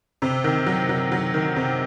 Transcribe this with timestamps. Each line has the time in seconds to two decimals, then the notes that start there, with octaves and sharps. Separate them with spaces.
0.22 C3
0.44 D#3
0.66 F#3
0.89 F#3
1.12 F#3
1.34 D#3
1.56 C3